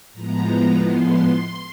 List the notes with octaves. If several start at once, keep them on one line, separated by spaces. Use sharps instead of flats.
A2 F3 G#3 B3 A#5
C6